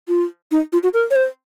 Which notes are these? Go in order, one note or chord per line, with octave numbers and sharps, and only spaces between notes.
F4
D#4
F4
F#4
A#4
C#5
C5